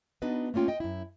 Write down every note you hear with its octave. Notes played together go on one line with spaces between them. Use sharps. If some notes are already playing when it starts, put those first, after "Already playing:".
B3 D4 D#4 F#4 B4 D#5
A3 A#3 C#4 F4 G5
D#5 G5
F#2 E4